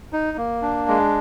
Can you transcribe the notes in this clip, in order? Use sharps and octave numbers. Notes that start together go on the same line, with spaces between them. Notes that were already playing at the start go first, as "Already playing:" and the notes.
D#4
A#3
D4
G#3